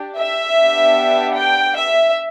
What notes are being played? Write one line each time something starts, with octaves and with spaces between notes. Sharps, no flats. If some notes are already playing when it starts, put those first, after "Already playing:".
Already playing: D4 G4
E5
B3 D4 G4
G5
E5